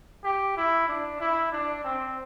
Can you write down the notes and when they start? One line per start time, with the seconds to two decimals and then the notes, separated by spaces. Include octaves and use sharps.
0.24 G4
0.57 E4
0.88 D4
1.20 E4
1.52 D4
1.84 C4